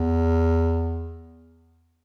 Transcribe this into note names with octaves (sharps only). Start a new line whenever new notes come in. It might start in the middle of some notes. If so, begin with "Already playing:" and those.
Already playing: E2